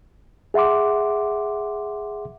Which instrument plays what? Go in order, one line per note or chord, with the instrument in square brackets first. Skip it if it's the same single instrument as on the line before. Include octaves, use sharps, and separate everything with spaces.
[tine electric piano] G#4 E5 F#5 C6 D6